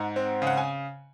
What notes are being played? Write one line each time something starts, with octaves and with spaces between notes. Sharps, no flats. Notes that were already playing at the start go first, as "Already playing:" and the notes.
Already playing: G#2 F#5 A#5
C4
C#3
F#5
G#5